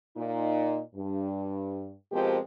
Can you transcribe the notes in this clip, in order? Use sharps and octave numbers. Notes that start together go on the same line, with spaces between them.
A#2 D#4
G2
B2 F3 G#3 C4 G4 A#4